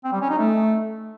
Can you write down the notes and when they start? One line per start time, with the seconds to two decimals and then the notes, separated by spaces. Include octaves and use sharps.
0.04 C4
0.13 G3
0.21 C#4
0.30 D#4
0.38 A3